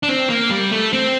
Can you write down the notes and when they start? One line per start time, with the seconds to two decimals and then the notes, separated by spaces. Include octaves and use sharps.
0.03 D4
0.08 C4
0.30 A#3
0.51 G3
0.72 A3
0.93 C4